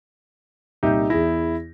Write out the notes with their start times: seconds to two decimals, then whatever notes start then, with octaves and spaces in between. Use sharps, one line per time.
0.83 C2 A#2 D#4 G4 E5 G6
1.10 E2 E4 G#4 A#6